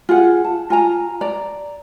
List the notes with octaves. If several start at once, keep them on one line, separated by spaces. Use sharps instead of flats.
F4 G#4 F#5
A5
F4 G#5 A#5
D5 A#5